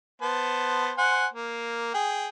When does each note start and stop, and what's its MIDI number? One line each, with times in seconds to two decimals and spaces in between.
0.22 0.91 59
0.22 0.91 72
0.22 0.91 81
0.98 1.26 72
0.98 1.26 78
0.98 1.26 80
1.33 1.93 58
1.94 2.28 68
1.94 2.28 79